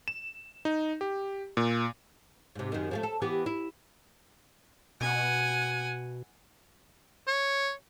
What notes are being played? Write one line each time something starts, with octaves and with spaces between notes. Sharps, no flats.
E7
D#4
G4
A#2
G#2 C3
F#2 D#3
F3 G#3 A3
A4
E3 B3 G4
E4
B2 F#5 G#5
C#5